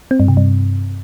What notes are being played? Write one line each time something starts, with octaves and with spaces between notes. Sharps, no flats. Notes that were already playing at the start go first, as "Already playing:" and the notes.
C4
G2
C3
G2